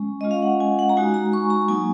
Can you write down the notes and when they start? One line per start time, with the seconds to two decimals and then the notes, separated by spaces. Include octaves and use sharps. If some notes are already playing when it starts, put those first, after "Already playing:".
Already playing: G#3 C#4
0.21 G#3 C#4 F4 D#5
0.31 F5
0.42 F#5
0.60 G#5
0.79 F#5
0.89 A#5
0.97 G#3 D#4 F#4 G#5
1.14 A#5
1.33 C#6
1.50 A#5
1.69 F#3 A#3 D#4 G#5